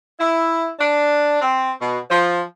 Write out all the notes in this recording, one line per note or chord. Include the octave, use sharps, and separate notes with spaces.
E4
D4
C4
B2
F3